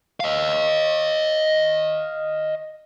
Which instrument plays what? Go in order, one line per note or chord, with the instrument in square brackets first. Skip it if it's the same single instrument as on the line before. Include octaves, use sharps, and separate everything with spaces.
[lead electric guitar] D#5 F5